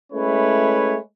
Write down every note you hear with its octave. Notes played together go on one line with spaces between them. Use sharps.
G#3 A3 C#4 E4 B4 C#5